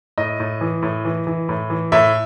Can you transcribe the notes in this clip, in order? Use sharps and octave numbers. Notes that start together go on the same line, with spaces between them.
A2 D#5
A2
E3
A2
E3
E3
A2
E3
A2 E5